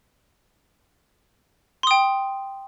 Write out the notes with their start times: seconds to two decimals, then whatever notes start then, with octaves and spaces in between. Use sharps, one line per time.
1.83 C6
1.87 D#6
1.91 G5